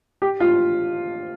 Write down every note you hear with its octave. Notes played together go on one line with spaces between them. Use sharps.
G4
F4